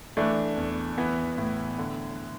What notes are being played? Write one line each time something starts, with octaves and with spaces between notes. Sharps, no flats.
E3 A3 D4
E2
E3 B3
A2
D3